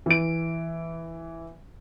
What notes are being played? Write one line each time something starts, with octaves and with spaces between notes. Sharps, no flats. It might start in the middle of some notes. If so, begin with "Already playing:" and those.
E3 D7